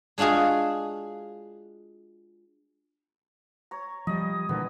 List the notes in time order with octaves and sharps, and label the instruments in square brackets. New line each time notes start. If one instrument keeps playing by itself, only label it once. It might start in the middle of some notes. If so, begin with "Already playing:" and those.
[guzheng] G#3 D4 F4 F#4 G#4
[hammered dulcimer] C#5 A#5
[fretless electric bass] F3 G3 [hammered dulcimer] D#5
[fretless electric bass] A#2 D3 E3 [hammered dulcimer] B3